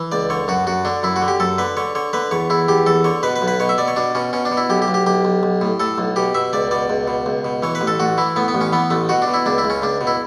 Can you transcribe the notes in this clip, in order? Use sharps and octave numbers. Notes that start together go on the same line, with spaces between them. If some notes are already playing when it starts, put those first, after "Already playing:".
Already playing: E3
C#2 D5
D3 C#5
F#2 F#4
F#2 F#4
D3 D4
F#2 E4
F#4
D3
G4
F#2 A4
D3 B4
D3 C#5
D3 C#5
D3 B4
E2 C#5
E2 E4
E2 G4
E2 A4
D3 C#5
B2 B4
B4
B1
B4
B2 C#5
E5
B2 D5
C#5
B2 D4
B2 C#4
B2 C#4
D4
B2
E4
B1 G4
G4
B1
G4
B1 G4
B1
B1
A2
A2 A4
B1
B2 G4
B2 E5
C#2 D5
B2 D5
C#2
B2
C#2
B2
E3 C#5
B4
A1
A4
A1 F#4
E3 E4
A2 B3
B3
A1
C#4
E3 B3
A1 A3
B2 F#4
D4
B2
E4
C#2 D4
E4
C#2
C#4
C#2 D4
B2
E4